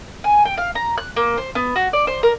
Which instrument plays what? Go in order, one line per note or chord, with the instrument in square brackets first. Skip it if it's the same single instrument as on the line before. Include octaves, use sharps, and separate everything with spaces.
[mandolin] G#5
G5
F5
A#5
F#6
A#3
C5
B3
F#4
D5
C5
A#4